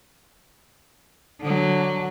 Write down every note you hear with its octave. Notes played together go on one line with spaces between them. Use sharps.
D3 F#3